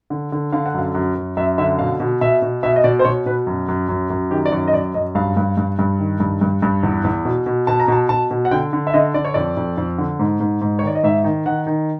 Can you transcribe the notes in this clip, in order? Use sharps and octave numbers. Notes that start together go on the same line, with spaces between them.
D3
D3
D3 F5
F#5
F#2 F5
F#2
F#2
F#2 E5
D3 E5
B2 F5
B2
B2 E5
B2
B2 E5
D#5
B2 D5
C5
B2 C#5
B2 B4
F#2
F#2
F#2
F#2
D#3 G4
D5
F#2 C#5
D#5
F#2 D5
F#2 D#5
G2 F5
G2
G2
G2
D#3
G2
G2
G2
E2
E2
B2
B2
B2 A5
A#5
B2 A5
B2 A5
B2
F#5
D3 G5
D3
E5
D3 D#5
D3 D5
C#5
F2 D5
F2
F2
D3
G#2
G#2
G#2
C#5
D#3 D5
D#5
G#2 E5
D#3
D#3 F#5
D#3